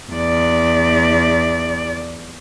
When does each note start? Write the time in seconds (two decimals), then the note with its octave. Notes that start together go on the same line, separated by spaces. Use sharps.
0.12 E2 D5